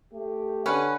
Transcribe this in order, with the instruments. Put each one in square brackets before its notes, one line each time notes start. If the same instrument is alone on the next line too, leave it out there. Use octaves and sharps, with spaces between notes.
[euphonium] A3 [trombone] G4
[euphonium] D3 [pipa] C#4 [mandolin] B4